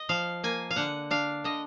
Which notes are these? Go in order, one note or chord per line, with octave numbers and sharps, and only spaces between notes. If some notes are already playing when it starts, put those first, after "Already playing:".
Already playing: D#5
F3 F5
A#3 G#5
F5
D3 F#5
D4 F5
D3 D#5